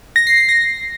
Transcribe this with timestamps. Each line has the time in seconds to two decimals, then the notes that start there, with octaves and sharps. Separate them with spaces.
0.16 A#6
0.27 C7
0.38 C7
0.49 A#6